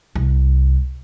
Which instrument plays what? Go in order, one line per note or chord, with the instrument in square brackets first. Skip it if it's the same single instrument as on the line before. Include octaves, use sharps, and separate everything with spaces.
[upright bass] C2